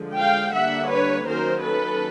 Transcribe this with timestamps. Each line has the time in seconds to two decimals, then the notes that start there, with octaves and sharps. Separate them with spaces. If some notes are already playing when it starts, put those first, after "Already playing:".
Already playing: D3 F3 G#3
0.16 F5 G5
0.53 D3 G3 A#3 D4 E5 F#5
0.90 B4 C#5
1.27 D#3 F#3 A#3 C#4 A#4 C5
1.63 A4 B4